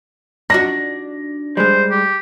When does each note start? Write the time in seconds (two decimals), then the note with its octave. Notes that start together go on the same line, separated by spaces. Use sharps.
0.50 D4 D#4 F#4 A#6
1.57 G3 G#3 C5
1.91 G4